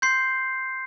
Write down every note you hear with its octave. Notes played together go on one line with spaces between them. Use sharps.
C6 G6 C7